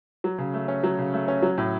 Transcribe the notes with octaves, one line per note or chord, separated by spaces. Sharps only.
F#3
C#3
A3
C#4
F#3
C#3
A3
C#4
F#3
A2